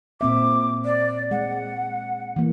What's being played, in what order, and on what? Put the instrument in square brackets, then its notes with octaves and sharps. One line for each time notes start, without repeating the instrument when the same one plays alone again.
[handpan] A#2 C4 E5 [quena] D6
[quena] D5
[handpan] G#3 [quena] F#5
[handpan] E3 A#3